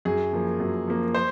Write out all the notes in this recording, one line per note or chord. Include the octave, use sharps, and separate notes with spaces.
F#2 G#4
F3 A#3
F#2
F3 A#3
C5